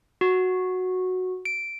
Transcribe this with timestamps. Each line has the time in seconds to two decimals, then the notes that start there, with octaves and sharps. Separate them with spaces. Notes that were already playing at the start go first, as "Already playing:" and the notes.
0.21 F#4
1.45 D7